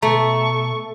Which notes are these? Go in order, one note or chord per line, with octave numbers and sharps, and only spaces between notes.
B2 A3 A#5 C#6